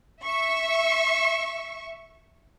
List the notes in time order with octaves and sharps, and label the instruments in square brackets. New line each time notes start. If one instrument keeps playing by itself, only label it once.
[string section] E5 C#6